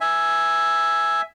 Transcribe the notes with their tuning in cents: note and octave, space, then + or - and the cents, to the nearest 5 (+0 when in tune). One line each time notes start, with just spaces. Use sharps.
E5 +0 G#5 +0